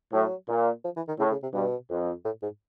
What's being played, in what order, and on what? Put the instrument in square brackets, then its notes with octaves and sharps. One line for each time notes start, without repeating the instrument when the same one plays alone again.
[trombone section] A2 [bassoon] F#3
[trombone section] A#2
[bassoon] F3
E3
D#3
[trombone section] A2 [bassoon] C#3
[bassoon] C#3
C3
[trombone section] G2 [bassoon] B2
[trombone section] F2
[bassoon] A2
G#2